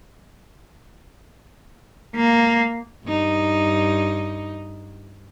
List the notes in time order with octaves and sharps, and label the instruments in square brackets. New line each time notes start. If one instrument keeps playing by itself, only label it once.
[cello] A#3
[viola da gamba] G2 D#4